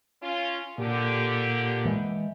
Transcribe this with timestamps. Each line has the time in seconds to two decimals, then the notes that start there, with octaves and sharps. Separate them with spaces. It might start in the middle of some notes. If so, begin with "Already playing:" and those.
0.21 C#4 F4
0.78 A#2 D3 G4
1.85 E3 G#3